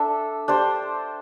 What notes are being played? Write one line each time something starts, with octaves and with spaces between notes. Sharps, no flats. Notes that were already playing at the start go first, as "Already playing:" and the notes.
Already playing: D4 A4 E5
D4 G4 C5